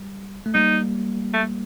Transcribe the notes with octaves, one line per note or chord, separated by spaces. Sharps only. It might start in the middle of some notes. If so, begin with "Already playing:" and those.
Already playing: G3
A3
G3 A#3 D#4
A3